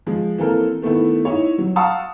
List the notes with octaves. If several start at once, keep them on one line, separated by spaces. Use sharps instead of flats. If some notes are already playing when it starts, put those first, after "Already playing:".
F3 G#3
E3 A#3 C4 A4 A#4
D#3 A3 B3 E4
D#4 E4 C#5
F#3
F5 F#5 A5 C#6 D#6 E6